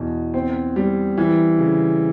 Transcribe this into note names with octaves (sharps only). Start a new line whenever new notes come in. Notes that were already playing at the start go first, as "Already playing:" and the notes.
Already playing: E2 B2
C4
G3
E3
C#3